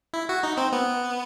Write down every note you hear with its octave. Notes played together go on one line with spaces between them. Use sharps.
E4
F#4
D#4
C4
B3